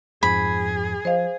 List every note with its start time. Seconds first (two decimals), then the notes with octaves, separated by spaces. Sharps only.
0.23 F2 G#2 F3 G#4 B5
1.05 F3 C5 D#5 F5